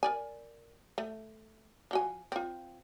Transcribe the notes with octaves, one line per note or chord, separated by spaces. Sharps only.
A#4 D5 G#5
A3
F3 F#4 G#5
C4 F4